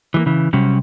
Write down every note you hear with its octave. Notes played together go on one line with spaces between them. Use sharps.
E3 G3 A#3
C#3 E3
C3 F#3 G3 C#4 F#4